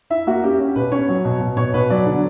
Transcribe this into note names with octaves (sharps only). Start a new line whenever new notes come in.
E4 E5
A#3 F#4
C#4 G4
C#4
B2 B4
C#4 C#5
F#3
B2
B2
B2 C#5
B2 B4
F#3 D5
D3